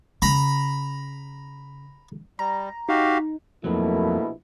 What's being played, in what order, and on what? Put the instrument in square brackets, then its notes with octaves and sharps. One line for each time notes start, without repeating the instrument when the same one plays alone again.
[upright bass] C#3 [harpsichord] A#5 B5
[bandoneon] G3 [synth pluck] A#5
[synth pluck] D#4 [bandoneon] F#4 G4 F5
[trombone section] A#1 B2 E4 [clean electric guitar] F2 F#3 [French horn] A3 [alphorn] A#3